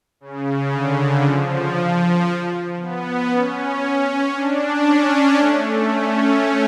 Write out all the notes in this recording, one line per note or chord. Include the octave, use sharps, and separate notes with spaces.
C#3
D3
F3
B3
C#4
D4
C#4
A3
C#4